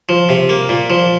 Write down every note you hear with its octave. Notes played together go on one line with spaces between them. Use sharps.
F3
C3
A#3
A#2
F3